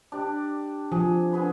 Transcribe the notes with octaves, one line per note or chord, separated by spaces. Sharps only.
D4 G4 D5
F3 G#4
D3 G#4 B4